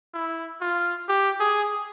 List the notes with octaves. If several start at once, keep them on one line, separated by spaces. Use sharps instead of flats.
E4
F4
G4
G#4